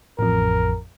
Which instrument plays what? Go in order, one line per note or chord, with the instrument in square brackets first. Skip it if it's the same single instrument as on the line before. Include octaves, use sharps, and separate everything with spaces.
[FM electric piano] A1 F2 [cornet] A#4